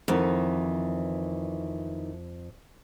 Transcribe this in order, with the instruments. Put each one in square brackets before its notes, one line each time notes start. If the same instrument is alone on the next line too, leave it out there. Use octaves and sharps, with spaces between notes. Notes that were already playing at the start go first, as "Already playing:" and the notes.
[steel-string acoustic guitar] F2 [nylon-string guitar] D#3 E3 B3